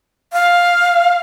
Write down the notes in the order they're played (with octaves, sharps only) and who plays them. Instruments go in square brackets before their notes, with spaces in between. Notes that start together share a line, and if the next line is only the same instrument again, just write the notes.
[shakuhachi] F5